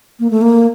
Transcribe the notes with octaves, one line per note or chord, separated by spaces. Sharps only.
A#3
A3
A#3